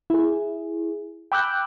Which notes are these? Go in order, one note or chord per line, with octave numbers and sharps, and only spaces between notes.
E4 G#4
G5 B5 D6 E6 F#6 G6